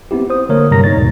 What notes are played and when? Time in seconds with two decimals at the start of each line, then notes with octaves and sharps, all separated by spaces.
0.11 B3 C4 E4 G4
0.30 C5 D#6
0.49 D3 A3 A#3 A#4 C#5
0.70 G2 C3 G3 A#4 A#5 A#6
0.84 D#4 C#5 A6
0.97 D#2 G#2 B2